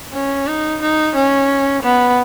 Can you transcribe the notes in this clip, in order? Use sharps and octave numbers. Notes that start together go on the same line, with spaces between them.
C#4
D#4
D#4
C#4
B3